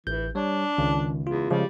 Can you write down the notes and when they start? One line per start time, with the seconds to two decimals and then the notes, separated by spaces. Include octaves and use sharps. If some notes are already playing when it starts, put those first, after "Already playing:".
0.07 A1 E3 G6
0.35 G3 D4 C#5
0.78 C#2 D#3
1.27 E2 F4
1.50 C#3 F3 G3 G#3 G4